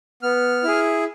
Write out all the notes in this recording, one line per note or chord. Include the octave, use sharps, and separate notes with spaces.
B3 F6
E4 G#4